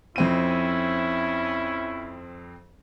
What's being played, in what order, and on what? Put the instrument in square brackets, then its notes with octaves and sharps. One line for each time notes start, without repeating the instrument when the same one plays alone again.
[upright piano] F2 C4 D#7 [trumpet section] C#4 E4